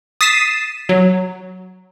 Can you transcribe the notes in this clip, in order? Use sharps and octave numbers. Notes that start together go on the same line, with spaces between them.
D#6 A6 B6 C7 D#7 E7
F#3